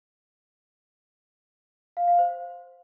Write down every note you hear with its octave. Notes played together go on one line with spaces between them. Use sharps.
F5
F5
C5